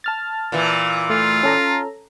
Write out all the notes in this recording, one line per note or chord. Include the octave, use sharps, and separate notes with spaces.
A5 F6 A6
A#2 E3
A3 F4
C#4 A4 A#5